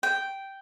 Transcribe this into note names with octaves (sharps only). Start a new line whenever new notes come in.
G5